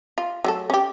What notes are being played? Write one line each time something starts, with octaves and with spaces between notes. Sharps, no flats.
F4
F#3 A3 A4
C#4 G4